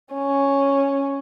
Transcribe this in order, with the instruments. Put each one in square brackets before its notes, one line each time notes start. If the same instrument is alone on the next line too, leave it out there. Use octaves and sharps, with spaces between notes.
[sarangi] C#4